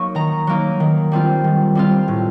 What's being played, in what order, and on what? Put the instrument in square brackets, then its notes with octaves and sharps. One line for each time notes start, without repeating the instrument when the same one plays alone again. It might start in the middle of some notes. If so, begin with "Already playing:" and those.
Already playing: [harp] F#3 A#3 D#4 C#6
D#3 A#5
F#3 A#3 D#4
D#3
G3 C4 F4
D#3
G3 C4 F4
A2